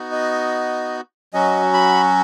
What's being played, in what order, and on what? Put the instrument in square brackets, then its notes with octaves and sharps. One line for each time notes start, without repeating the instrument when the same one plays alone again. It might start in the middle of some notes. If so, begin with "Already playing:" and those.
Already playing: [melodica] B3 D#4 F#4
D#5
F#3 C#4 F#4 D#5
B5